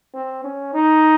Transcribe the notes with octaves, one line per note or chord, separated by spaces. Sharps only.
C4
C#4
D#4